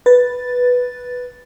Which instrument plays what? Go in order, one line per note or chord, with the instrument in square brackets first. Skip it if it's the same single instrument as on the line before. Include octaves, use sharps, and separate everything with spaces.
[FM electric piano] B4 A6